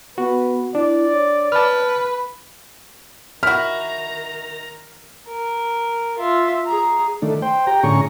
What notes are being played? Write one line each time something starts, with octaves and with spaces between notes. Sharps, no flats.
B3 F#4 B4
D4 E4 D5
C#5
B4 A5 F6
D#3 E4 F#4 A#5 F6
A#4
F4 E5
G#4 A#5
D#3 A3 D4
C5 G5
G4 G5 A#5
A2 D3 C#4 G#4 A#5 C#6